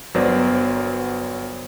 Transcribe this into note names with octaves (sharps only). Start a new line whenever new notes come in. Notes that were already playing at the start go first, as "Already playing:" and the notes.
G1 F#3 B3 A#4 C5 D5